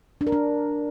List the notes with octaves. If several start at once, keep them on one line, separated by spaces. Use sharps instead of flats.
D4
A#4
D4